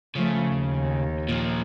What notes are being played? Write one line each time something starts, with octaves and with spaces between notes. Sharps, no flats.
C#3 F3 A3
D#2
A#2 F3